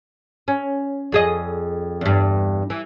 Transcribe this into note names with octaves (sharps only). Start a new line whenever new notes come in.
C#4
F2 G#4 D#5
E2 G2
E3